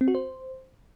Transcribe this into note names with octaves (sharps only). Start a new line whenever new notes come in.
C4
F#4
C5